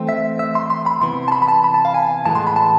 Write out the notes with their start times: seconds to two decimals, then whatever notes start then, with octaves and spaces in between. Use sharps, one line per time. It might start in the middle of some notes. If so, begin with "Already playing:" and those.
Already playing: E3 A3 C4
0.09 E5
0.39 E5
0.55 C6
0.70 C6
0.86 B5
1.01 C3 E3 B3 C6
1.28 A5
1.32 B5
1.42 B5
1.48 A5
1.64 B5
1.74 A5
1.85 F5
1.94 G#5
2.26 A2 E3 G#3 B3 A5
2.35 C6
2.47 B5
2.56 A5